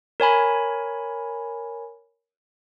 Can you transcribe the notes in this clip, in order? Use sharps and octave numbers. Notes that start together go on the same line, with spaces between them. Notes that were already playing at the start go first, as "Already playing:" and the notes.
A#4 C#5 G#5 B5